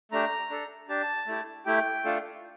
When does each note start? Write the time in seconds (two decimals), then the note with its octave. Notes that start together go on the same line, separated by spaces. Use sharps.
0.12 A3 D4 G4 A#5
0.50 D4 A4
0.88 D4 G4 A5
1.27 A3 E4 G4
1.66 A3 E4 G4 G5
2.05 A3 D4 F4 A4